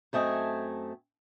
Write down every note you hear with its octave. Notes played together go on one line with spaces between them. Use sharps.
F#2 A3 C4 D#5 G#5